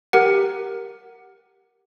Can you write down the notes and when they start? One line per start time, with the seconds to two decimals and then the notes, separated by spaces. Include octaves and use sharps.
0.13 G4 A#4 F#5